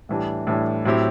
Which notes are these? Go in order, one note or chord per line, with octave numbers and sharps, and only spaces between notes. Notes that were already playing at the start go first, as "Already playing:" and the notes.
A2 E3 G3 D4
A2 E3 G3 D4
A2 F#3 C4 E4 G4